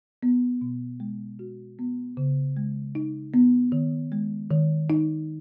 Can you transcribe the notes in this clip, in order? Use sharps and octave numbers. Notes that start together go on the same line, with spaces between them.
B3
B2
G#3
F#4
B3
C#3
G#3
D#4
B3
D#3
G#3
D#3
D#4